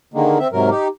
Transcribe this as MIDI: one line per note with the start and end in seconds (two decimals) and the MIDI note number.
0.14 0.38 50
0.14 0.38 51
0.14 0.38 56
0.14 0.38 58
0.39 0.48 60
0.39 0.48 76
0.52 0.70 44
0.52 0.70 48
0.52 0.70 54
0.52 0.70 70
0.70 0.88 63
0.70 0.88 67